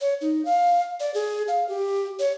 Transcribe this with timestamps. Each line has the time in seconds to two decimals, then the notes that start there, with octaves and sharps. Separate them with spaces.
0.01 C#5
0.21 D#4
0.45 F5
1.00 D5
1.14 G#4
1.48 F5
1.69 G4
2.19 C#5